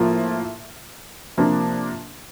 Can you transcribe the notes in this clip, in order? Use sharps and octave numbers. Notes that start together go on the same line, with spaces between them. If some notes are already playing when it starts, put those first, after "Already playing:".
Already playing: A2 F3 A#3 F4
C3 F3 A#3 D4